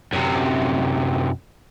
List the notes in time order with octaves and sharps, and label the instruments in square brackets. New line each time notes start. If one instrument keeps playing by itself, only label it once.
[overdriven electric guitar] F#2 C3